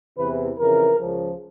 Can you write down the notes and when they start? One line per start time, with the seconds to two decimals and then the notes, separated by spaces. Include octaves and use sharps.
0.18 E2 C3 E3 B4
0.58 F2 C#3 E3 A#4
0.99 C#2 C#3 F3